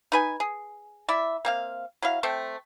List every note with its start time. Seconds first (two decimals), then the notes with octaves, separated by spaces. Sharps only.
0.12 D#4 B4 G#5
0.40 G#4
1.08 E4 D5 E5
1.45 A#3 C4 F5
2.02 F#3 E4 F5
2.23 A3 C4 A4 G5